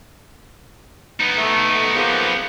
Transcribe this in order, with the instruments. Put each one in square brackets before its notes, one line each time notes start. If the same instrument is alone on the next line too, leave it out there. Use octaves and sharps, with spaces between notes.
[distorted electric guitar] B3 D#4
[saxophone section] A3
F3 A#3 G#4